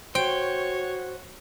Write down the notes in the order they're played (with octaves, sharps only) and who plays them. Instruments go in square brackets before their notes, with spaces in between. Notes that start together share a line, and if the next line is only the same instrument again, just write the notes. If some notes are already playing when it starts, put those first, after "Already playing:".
[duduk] F#4 [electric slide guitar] C5 [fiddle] C#5 [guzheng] G5